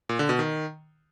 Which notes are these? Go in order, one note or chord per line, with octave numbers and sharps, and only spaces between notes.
A#2
D3
B2
D#3